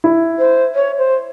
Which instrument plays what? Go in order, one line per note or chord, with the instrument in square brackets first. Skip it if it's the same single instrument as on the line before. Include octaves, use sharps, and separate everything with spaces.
[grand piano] E4
[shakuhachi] C5
C#5
C5